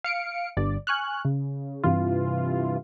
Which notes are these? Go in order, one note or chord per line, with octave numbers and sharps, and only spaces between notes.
F5 C#7 D7
G1 G2 D5
G#5 C#6 F6 F#6
C#3
G2 C3 E3 F4